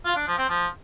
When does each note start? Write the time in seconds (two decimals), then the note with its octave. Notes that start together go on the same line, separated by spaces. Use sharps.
0.05 F4
0.16 D4
0.27 F3
0.38 C4
0.49 F3